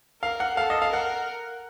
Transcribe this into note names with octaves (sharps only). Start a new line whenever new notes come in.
A#4 F5
F#5
A4 F5
D#5
F5
A#4 F#5